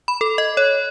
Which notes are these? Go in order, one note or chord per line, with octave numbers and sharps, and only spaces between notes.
B5
A4
D#5
C#5